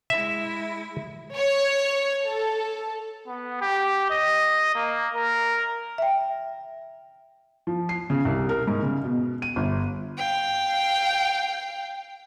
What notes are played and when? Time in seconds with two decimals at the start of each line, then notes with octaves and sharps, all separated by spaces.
0.10 G#3 E4 E5
1.34 C#5
2.25 A4
3.27 B3
3.61 G4
4.10 D#5
4.75 A#3
5.15 A#4
5.98 E5 G5
7.67 F3
7.89 C7
8.10 C#3
8.25 C2
8.49 A#4
8.67 G#2
8.82 C#3
9.04 B2
9.42 D#7
9.56 G1
10.17 F5 G5